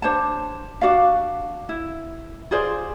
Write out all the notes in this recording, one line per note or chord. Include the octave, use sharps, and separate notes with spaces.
D4 C5 C#5 A5
D4 F#4 D5 F5
E4
F4 G#4 C5 D5